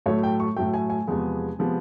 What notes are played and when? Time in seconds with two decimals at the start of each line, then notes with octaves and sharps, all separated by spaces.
0.06 A2 F#3 A3 C#5
0.23 G5
0.40 C#6
0.56 A2 F#3 A3 G5
0.74 G#5
0.90 G#5
1.07 E2 C3 F3 G#3 B3
1.59 C3 F3 G#3 B3